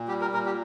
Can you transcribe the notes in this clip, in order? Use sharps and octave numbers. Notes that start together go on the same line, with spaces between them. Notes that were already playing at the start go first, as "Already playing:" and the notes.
Already playing: A#2
G3 G4
A#4
A#2 A#4
G4